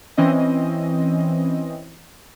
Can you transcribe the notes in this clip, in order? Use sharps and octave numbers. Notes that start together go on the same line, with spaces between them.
E3 C4 C#4 D#5